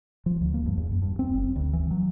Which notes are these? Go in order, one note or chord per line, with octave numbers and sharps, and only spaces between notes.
F3
D2
A#3
G2
E2
F#2
G2
C4
F#1
D2
E3
F#3